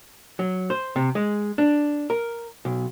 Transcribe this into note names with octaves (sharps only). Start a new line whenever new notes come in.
F#3
C5
C3
G#3
D4
A#4
B1